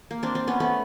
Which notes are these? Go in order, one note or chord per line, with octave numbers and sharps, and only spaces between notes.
A#3
C4 D4
C4 D4
B3 C#4
A3 B3